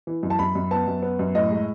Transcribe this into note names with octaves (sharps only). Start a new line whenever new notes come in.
E3
F#2
A5
F#2 B5
F#2
B3 A5
F#2
B3
F#2
A2 D#5
G#3